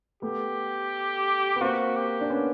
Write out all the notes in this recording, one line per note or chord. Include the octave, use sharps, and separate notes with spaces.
A3 B3 G4
B3
A#3 C4 F#4
G4
D4
B3 C#4